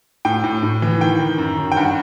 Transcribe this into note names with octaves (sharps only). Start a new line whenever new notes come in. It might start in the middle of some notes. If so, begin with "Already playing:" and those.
A2 G5
A2
A2
E3
D#3 G5
D#3
F#2
D#3
G5
G2 F#5